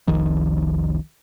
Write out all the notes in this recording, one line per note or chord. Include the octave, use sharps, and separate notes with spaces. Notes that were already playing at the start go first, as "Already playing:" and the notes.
F1 C2 D#3 F3